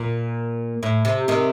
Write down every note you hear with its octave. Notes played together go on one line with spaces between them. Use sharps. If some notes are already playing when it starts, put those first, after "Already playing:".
Already playing: A#2
A2
C3
C3 D#3